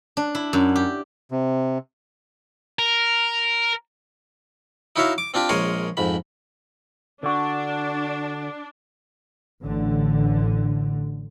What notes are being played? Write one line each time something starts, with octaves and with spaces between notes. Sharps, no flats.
D4
E4
F#2
G4
C3
A#4
D#4 E4 F#4 C#5 E5 F5
D6
C4 D4 F4 G4
A#1 G#3 A#4 C#5 G#5 C6
F2 G#2 B5
D3 D4 F#4
A1 D3